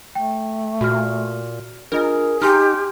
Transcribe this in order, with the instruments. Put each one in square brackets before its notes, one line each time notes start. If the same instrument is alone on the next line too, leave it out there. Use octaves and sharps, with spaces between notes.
[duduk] A3 [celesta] G5
[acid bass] A#2 [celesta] F#4 F6
[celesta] D4 F4 D#5 [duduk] G#4 [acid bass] A#4
[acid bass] D#4 [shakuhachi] G4 [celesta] G#5 C6 F6